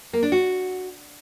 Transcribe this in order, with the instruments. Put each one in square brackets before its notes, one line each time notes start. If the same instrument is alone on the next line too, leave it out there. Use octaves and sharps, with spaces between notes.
[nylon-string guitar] A#3
D4
F#4